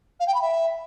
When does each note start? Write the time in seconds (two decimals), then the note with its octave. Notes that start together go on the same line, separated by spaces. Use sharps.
0.20 F5
0.27 G5
0.34 B5
0.41 E5